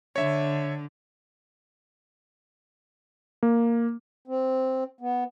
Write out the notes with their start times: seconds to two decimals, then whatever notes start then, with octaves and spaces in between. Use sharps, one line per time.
0.16 D3 C#5 E5
3.43 A#3
4.28 C4
5.01 B3